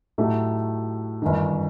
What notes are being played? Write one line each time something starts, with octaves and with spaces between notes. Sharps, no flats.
A2 F#3 A3 D#4 G4
G1 F#2 D#3